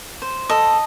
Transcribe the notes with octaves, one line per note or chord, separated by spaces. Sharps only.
C5
A4 D#5